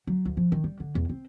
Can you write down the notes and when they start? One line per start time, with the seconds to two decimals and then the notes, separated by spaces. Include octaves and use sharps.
0.07 F#3
0.25 D2
0.37 F3
0.52 D#3
0.64 G3
0.80 D3
0.95 E2
1.09 C4